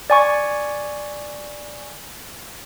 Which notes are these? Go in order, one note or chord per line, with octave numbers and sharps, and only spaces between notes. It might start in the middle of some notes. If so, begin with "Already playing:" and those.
D5 G#5 C#6